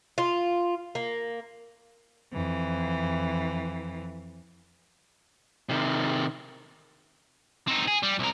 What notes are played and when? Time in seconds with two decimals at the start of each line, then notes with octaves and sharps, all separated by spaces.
0.18 F4
0.95 A#3
2.33 F2 E3
5.69 C3 D#3
7.68 C4 D#4
7.88 G#4
8.03 G3
8.19 C2 A#4